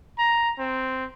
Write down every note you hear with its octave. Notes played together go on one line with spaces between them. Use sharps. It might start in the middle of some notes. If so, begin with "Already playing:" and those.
A#5
C4